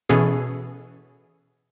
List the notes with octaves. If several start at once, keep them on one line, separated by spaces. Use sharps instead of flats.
B2 E3 B3 C#4 G#4 A4